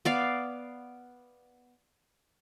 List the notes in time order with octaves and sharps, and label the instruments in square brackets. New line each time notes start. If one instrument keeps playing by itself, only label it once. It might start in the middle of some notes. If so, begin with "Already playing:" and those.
[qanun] B3 D5 F5